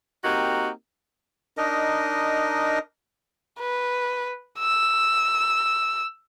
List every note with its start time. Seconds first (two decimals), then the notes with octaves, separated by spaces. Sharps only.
0.24 A#3 C4 D#4 F#4 G4 A#4
1.57 D4 D#4 A#4 D#5
3.60 B4
4.59 E6